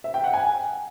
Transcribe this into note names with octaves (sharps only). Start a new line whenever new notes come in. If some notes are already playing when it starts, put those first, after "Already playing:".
E5
G5
F#5
G#5